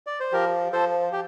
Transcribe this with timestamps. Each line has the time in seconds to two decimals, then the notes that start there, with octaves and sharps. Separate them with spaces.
0.07 D5
0.20 C5
0.32 F3 G4 A#4
0.72 F3 A4 C5
1.12 G4